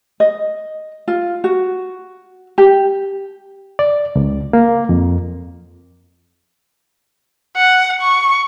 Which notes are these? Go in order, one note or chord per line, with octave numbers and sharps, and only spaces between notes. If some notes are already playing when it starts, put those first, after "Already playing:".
D#5
F4
F#4
G4
D5
C#2
A#3
F2
F#5
C#6